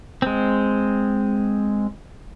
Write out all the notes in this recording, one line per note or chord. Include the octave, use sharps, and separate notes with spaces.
G#3 C4